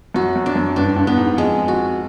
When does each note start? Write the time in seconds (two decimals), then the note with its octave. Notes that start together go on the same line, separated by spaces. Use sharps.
0.14 F#2 F#4
0.36 F#2
0.46 D4
0.55 F#2
0.76 G2 D4
0.96 G2
1.07 B3
1.17 G#2
1.37 F2 G#3
1.68 F#4